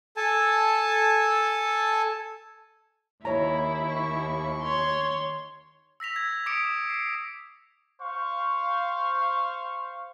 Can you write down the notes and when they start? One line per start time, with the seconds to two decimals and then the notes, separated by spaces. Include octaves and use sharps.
0.17 A4 G#5 A5
3.25 D#2 E4 C#5 A#5
3.88 C#6
4.62 C#5 C6
6.00 E6 A#6 B6 F7
6.16 G#6
6.46 D6 D#6 B6 C#7 D7
6.90 C7 C#7
8.01 C5 F5 C#6